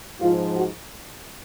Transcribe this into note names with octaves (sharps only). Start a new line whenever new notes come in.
G#2 F3 F4
F#4